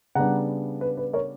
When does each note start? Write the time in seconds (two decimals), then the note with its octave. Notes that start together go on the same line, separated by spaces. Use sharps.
0.15 C#3 G3 B3 D4 F#5 A#5
0.81 B4
0.97 B4
1.13 A#4 C#5